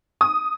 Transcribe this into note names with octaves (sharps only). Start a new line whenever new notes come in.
D#6